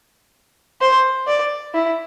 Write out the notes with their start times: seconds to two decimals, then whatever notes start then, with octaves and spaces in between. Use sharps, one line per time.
0.81 C5
1.27 D5
1.74 E4